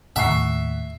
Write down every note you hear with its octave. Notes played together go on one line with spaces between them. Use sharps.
D#2 A2 E5 F#5 C#6 C7